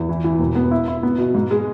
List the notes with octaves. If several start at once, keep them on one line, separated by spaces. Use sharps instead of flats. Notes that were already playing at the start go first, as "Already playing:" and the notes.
Already playing: E2
E3
E3
E1
B3
E4
E4
B3
B2
G#2
G#3